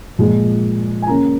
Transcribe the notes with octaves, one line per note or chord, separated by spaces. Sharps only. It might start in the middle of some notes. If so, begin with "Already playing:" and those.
A#2 F3 G#3
G#5
C#3 A#3 C#4 A#5